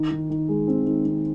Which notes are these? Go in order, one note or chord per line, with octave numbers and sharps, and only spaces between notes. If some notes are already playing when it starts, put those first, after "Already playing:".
Already playing: D#3
D#3
D#3
G#3
C4
D#3
C4